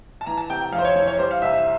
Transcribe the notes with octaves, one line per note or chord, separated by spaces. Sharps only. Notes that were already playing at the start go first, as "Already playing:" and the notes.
A5
E3 A#5
A5
C3 G5
G5
F2 F5
C5
C#5
E3 C#5
C#5
G3 C5
F5
C2 E5
E5